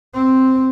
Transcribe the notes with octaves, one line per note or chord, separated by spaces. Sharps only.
C4